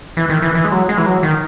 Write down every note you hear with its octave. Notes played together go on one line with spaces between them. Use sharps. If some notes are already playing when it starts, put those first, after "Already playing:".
E3
D#3
E3
E3
G#3
F#3
G#3
E3
F#3
D#3